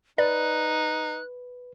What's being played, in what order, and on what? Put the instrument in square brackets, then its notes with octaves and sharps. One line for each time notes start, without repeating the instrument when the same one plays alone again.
[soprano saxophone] D#4 [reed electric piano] B4 [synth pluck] D5 [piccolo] F#6